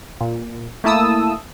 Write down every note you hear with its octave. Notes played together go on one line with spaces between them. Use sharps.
A#2
A3 A#3 E4 A5 D#6 E6